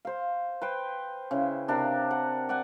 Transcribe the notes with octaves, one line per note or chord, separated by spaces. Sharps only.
C5 F5
B4 C5 G5
C#3 E4
C3 D4 A#4 F5
F#5
D5 F#5 G#5